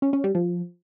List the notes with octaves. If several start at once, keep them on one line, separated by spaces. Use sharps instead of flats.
C#4
C#4
G3
F3